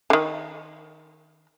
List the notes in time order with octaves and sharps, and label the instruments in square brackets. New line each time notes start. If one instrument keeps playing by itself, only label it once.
[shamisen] D3 D#3